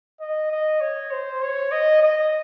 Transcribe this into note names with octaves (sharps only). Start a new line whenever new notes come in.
D#5
D#5
C#5
C5
C#5
D#5
D#5